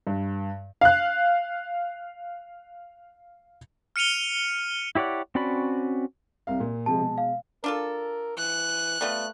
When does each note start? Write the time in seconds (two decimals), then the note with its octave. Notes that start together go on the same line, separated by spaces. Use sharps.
0.07 G2
0.81 F5 F#6
3.96 F6 C#7 D#7 F7 G7
4.95 E4 G4 C#5 D5 F#5
5.35 C4 C#4 F#4 D5 B5
6.47 C2 C3 F5
6.60 A#2
6.86 C3 F3 G#3 A5
6.99 B2 G#3
7.18 F5
7.64 D4 F4 A4 A#4
8.38 E3 F#6
9.01 G3 A3 B3 F4